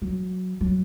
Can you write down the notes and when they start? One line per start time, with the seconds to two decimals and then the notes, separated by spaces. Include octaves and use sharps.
0.02 F#3
0.61 F#3